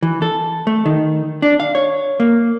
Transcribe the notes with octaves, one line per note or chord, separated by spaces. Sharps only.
E3
A4
A3
D#3
D4
F5
C#5
A#3